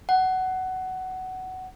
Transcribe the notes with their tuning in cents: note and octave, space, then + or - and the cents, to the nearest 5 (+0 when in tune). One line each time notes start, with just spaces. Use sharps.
F#5 +15